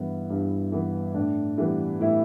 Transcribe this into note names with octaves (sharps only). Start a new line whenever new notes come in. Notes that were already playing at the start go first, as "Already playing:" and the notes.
Already playing: G2 E3 B3 E4
G2
E3 B3
A2 D4
E3 G3 B3
A2 E4